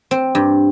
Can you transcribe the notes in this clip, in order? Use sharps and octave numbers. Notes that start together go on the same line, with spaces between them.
C4
G2